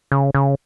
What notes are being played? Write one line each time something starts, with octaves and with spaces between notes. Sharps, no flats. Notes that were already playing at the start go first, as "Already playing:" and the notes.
C#3
C#3